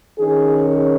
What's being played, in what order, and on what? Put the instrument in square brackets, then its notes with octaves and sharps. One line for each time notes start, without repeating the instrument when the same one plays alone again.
[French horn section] D#3 C#4 G#4
G#4